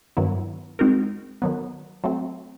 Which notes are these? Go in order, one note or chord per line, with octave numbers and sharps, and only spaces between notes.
G2 D#3 F#3 B3 E4
G#3 C4 D#4 F#4 A#4
D#3 F#3 B3
F#3 A3 C4